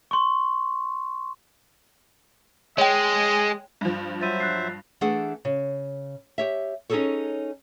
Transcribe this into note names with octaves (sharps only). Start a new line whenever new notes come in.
C6 C#6
G#3 C#5 D#5 G5
G2 F3
F#3 C5 E5 A6 D#7
F#6 A6 C7
E3 A3 D4 G#4 F#5
C#3
G4 C#5 E5
C#4 D#4 E4 G#4 A4 C#5